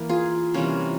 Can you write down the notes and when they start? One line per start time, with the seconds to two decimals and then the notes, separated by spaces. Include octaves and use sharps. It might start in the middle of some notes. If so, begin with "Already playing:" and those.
Already playing: E3 A#3 A#4
0.09 F4 G#4
0.54 C3 E3 G3 A#3 C#4 F4